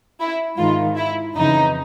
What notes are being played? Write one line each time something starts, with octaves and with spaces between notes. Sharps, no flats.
E4
G#2 D#3 F4
E4
F2 C#3 E3 D#4